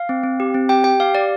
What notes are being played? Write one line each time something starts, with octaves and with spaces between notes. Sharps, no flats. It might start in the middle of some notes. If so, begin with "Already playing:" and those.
Already playing: F5
C4
C4
G4
C4
G4 G5
G4 G5
G4 F5
G4 D5